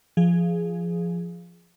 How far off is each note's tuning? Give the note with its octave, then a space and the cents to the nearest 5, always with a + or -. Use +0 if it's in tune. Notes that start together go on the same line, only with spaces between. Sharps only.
F3 -15 G#4 +0